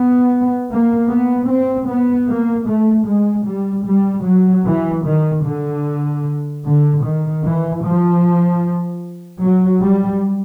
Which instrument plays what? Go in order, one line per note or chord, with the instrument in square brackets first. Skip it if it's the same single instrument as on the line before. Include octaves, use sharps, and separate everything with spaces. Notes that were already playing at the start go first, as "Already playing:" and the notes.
Already playing: [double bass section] B3
A#3
B3
C4
B3
A#3
A3
G#3
G3
G3
F#3
E3
D#3
D3
D3
D#3
E3
F3
F#3
G3